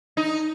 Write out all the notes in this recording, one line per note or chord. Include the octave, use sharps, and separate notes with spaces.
D#4